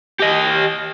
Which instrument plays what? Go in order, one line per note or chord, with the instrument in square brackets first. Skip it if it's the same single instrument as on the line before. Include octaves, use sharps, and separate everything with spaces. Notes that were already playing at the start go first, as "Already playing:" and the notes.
[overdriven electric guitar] G4 D#5